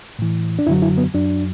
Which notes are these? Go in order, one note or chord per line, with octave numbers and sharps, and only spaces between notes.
A2 E3
D4
F#2 D3 F#3 E4
E4
B3
F#2 F#3 D4